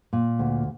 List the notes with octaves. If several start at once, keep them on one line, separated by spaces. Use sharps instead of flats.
A#2
D2